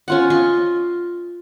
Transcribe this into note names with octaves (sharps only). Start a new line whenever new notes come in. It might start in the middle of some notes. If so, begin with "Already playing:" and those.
C#4 F4 F#5
F4 D#5 C6 C#6